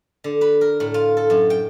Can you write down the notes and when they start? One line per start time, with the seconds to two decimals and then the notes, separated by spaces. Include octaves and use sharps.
0.24 D3
0.41 B4
0.61 A#4
0.80 A2
0.94 F4
1.17 A4
1.30 F#2
1.50 G5